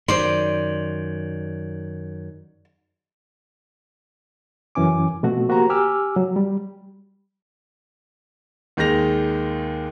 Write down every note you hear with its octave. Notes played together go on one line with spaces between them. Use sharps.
F#2 D#3 C5 D5 C6
F#2 E3 C#4 G#5 D6
B2 F3 A3 C4 F#4
A#3 F#4 G4 C5 A#5
G4 G#5 D6 E6 F6
F#3
G3
D#2 D#3 G#3 A#6 F7